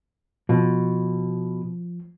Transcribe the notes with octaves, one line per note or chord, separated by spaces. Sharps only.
B2 F3